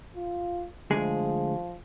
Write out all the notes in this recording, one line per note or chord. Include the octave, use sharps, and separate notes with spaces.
F4
D2 F3 G#3 G#4